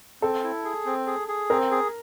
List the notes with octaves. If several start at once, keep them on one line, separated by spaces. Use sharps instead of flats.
C4 A4
E4
G#4
C4
G#4
G#4
C4 A#4
G#4